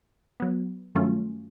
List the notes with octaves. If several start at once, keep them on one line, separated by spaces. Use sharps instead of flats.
F#3 B3
G2 D#3 F#3 A3 C#4 F4